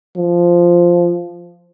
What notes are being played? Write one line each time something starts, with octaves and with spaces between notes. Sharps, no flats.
F3